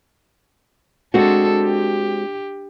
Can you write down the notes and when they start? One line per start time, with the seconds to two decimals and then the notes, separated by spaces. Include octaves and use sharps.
1.14 G#3 C4 D4 F#4 A4
1.64 G4